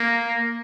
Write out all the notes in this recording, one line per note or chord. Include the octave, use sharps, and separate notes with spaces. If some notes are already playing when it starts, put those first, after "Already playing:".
Already playing: A#3